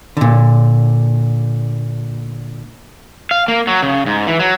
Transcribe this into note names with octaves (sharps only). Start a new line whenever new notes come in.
A#2 D3
F5
A#3
F#3
C#3
G#2
E3
F#3